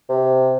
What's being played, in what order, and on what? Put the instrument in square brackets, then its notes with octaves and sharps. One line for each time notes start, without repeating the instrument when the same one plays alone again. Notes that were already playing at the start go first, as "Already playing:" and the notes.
[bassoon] C3